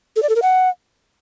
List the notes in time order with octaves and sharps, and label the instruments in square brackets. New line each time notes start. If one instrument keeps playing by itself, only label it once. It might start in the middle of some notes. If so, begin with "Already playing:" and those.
[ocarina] A4
D5
A4
A#4
F#5